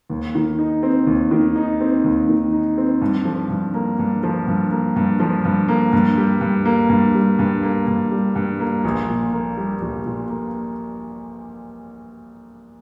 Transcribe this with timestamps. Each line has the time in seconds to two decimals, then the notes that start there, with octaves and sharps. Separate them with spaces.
0.10 D#2
0.35 D#3
0.59 D#4
0.83 C4
1.07 D#2
1.31 D#3
1.56 D#4
1.80 C4
2.04 D#2
2.29 D#3
2.52 D#4
2.78 C4
3.01 G2
3.25 F3
3.50 G2
3.74 A#3
3.99 G2
4.23 F3
4.47 G2
4.71 A#3
4.96 G2
5.20 F3
5.45 G2
5.68 A#3
5.93 G2
6.17 G3
6.41 G2
6.65 A#3
6.89 G2
7.15 G3
7.39 G2
7.63 A#3
7.87 G2
8.11 G3
8.35 G2
8.60 A#3
8.84 A#1
9.09 A#2
9.33 A#3
9.57 G3
9.81 A#1
10.06 A#2
10.29 A#3